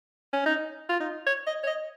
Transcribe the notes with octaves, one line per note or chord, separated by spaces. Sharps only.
C#4
D#4
F4
D#4
C#5
D#5
C#5
D#5